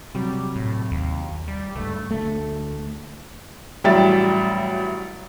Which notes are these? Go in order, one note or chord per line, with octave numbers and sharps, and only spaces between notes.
C3 F#3 G3
A2
D#2
G3
C#2 G2 A3
D2 A3
A1 F#3 G3 E5 A6